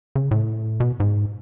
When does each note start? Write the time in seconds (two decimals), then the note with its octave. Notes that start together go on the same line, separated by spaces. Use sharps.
0.16 C#3
0.31 A2
0.80 B2
1.00 G#2